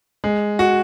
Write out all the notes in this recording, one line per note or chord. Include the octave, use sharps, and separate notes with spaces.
G#3
F#4